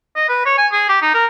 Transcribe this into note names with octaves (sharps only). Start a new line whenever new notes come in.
D#5
B4
C#5
G#5
G#4
G4
D#4
A#4